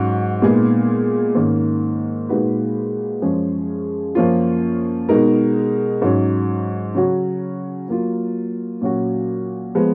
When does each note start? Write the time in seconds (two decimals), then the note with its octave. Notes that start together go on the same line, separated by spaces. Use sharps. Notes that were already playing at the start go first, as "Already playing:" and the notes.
Already playing: G#2 F#3 C#4 F#4
0.42 A#2 G#3 B3 D#4 G#4
1.35 G#2 D#3 A#3 C#4
2.29 A#2 G#3 D#4 F#4 B4
3.22 F#2 F3 G#3 C#4 G#4
4.15 F#2 F3 A#3 C#4 F4
5.09 B2 G#3 D#4 A#4
6.02 G#2 F#3 C#4
6.95 C#3 F#3 C#4 F#4
7.88 F#3 A#3 F4
8.81 A#2 F#3 C#4 F#4
9.75 F3 G#3 B3